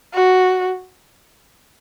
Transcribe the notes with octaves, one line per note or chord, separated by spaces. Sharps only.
F#4